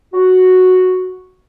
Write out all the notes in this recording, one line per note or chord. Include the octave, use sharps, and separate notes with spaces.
F#4